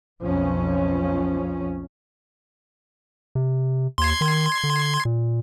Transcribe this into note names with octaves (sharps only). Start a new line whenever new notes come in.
B1 F2 F3 C#4
C3
D#2 C6 G#6
D#3
D3
A#2